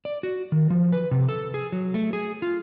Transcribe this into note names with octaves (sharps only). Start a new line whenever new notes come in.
D5
F#4
D#3
F3
B4
C3
A4
G#4
F#3
A3
G#4
F4